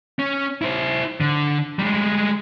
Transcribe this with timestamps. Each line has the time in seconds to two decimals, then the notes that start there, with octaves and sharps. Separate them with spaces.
0.19 C#4
0.62 E4 C5
1.21 D3
1.79 G3 G#3